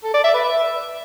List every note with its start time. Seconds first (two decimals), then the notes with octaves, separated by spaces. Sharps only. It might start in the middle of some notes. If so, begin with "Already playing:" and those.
0.04 A4
0.14 D5
0.24 E5
0.34 B4
0.44 E5